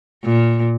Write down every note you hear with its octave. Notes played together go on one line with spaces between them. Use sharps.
A#2